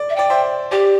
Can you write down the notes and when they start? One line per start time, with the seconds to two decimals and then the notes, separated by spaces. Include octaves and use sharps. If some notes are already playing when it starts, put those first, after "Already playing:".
Already playing: D5
0.10 E5
0.16 D5 G5
0.30 C5 E5
0.71 G4 D5 G5